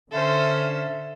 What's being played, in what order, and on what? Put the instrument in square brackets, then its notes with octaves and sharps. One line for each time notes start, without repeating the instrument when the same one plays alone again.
[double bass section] D3 [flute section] C#4 E5 F5 [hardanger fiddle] A4 C5